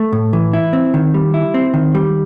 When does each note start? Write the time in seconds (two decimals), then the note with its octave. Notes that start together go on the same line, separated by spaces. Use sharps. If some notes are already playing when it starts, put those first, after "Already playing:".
Already playing: A3
0.13 A2
0.33 E3
0.53 E4
0.73 C4
0.94 D#3
1.14 G3
1.34 E4
1.54 C4
1.74 D#3
1.95 G3